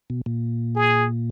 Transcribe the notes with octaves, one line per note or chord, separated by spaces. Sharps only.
B2
A#2
G#4